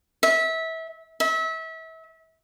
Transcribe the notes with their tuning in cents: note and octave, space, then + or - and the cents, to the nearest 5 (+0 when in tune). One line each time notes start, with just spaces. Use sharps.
E5 -25
E5 -30